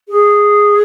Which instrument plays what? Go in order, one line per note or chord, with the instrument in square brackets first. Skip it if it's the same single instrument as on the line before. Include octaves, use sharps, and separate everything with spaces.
[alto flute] G#4